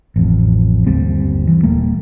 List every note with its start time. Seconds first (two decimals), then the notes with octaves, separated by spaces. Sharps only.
0.16 A1 F2
0.86 G1 D#2 G3 C4
1.47 E3
1.63 D#1 G3 A3 A#3